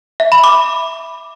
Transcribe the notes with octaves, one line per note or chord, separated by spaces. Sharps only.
E5
B5
D6